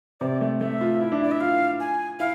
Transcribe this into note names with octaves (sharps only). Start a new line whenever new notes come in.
C3 D5
A3
A3 E5
F4
E4
D4
E4 D5
E5
F4 F5
G#5
E4 F5